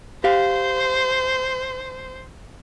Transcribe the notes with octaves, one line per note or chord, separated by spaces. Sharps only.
G4 C5 F5